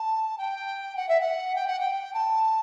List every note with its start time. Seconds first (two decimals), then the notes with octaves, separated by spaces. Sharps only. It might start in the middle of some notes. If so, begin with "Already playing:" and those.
Already playing: A5
0.37 G5
0.96 F#5
1.08 E5
1.20 F#5
1.55 G5
1.67 F#5
1.79 G5
2.13 A5